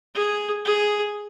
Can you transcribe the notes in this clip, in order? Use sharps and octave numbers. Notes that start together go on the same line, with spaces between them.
G#4
G#4